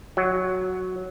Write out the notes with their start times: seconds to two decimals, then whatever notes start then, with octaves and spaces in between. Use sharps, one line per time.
0.17 F#3